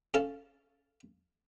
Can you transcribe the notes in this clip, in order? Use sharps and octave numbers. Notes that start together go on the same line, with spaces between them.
C#4 A4 F5 A5